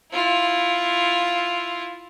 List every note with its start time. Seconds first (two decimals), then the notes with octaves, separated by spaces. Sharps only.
0.12 E4 F4